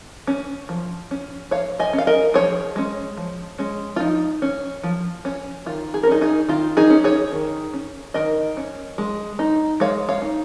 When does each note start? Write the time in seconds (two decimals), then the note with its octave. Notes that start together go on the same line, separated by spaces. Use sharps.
0.27 C#4
0.69 F3
1.11 C#4
1.51 F3 C#5 F5
1.79 D#5 G#5
1.93 C#4
1.98 F5
2.07 A#4 D#5
2.34 F3 G#4 C#5
2.76 G#3 C#4
3.17 F3
3.58 G#3 C#4
3.96 F4
4.00 F3 D#4
4.42 C#4
4.83 F3
5.25 C#4
5.66 D#3 F4
5.94 G#4
6.03 A#4
6.07 C#4 D#4 G#4
6.21 D#4 G#4
6.49 D#3 F4
6.77 D#4 G#4
6.90 C#4
7.04 G#4 C#5
7.32 D#3
7.74 C#4
8.14 D#3 A#4 D#5
8.57 C#4
8.98 G#3
9.39 D#4
9.80 G#3 C#5 F5
10.09 C#5 F5
10.22 D#4